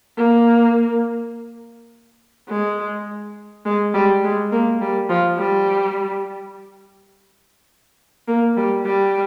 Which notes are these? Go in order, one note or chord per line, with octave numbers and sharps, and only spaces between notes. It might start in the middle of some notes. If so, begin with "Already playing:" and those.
A#3
G#3
G#3
G3
G#3
A#3
G3
F3
G3
A#3
G3
G3